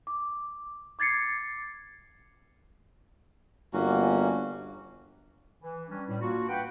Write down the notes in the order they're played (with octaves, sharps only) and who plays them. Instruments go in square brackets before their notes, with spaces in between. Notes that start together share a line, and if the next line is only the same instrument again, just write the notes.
[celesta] D6
D6 G#6 A6 C7 C#7
[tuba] G1 [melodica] A#3 C#4 F#4
[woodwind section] E3
G3 C#4 D4
A2 G3
A#3 D4 F4 F#4
B4 F#5 G5